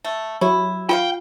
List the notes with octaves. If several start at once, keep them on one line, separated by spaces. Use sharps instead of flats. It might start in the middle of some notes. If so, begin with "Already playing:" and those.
A3
F#3 E4 G4
F4 F#4 C5 F5 G5